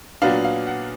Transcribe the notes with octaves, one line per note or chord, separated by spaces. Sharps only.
A#2 F#3 B3 D4 F5
F5
F#5